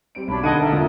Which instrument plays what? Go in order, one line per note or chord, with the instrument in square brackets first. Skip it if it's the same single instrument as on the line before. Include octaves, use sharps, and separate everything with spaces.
[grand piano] G3 C4 D7
[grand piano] B1 [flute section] D4 C#5 B5
[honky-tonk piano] D3 [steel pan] D#4 D#5 F#5 [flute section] A5 [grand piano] G#6 D7 D#7
[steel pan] A#4 E5 [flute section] A5
[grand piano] F1 F4 D#6 [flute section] A4